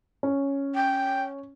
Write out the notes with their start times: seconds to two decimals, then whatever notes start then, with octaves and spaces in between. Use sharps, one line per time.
0.23 C#4
0.75 G5